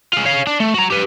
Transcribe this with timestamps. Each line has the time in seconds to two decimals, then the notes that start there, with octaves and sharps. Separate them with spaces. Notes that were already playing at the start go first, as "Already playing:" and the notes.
0.13 F4 G#4
0.25 C#5 F5
0.47 D4
0.60 A3
0.74 F#4 A#5
0.91 G4 B4